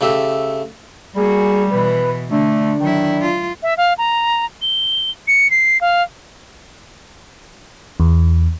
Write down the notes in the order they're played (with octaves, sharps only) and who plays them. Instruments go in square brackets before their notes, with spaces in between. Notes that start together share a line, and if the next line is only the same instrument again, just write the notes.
[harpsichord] C#3 A3 G4 E5
[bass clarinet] G3 [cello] A#3 F#4 [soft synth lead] G#4
[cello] B2 E3 [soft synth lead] B4
[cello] D3 [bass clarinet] A3 [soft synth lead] D4
[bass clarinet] D#3 [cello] F#3 E4
[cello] F4
[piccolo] E5
F5
A#5
G7
C#7
C7
F5
[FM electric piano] E2